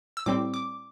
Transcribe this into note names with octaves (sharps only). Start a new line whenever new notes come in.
E6
A2 G3 C4 D6
D6